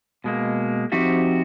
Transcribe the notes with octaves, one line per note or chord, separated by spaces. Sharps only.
B2 G#3 A#3
F3 C4 D#4 F#4 G4 E5